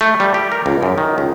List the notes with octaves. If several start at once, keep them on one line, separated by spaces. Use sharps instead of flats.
A3
G3
G4
A#4
C#2
F#2
D#3
C#2